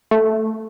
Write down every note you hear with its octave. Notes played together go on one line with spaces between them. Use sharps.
A3